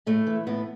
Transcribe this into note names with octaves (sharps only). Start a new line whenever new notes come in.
A2 A3
E3
A2 B3